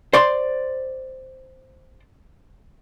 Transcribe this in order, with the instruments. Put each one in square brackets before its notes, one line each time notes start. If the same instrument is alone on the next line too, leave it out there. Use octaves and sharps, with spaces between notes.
[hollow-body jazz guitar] C5 D5 C6